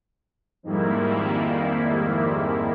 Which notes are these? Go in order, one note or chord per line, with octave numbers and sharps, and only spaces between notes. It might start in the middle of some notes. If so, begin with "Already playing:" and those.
F2 G#2 D#3 G3 A#3 E4